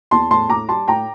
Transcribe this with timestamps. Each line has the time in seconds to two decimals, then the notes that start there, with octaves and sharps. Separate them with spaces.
0.11 E2 A5 C6
0.31 A2 A5 C6
0.49 A2 A#5 D6
0.68 G3 A5 C6
0.88 A2 G5 A#5